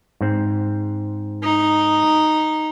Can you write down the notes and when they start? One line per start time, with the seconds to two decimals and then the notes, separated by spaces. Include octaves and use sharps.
0.21 G#2 C4
1.43 D#4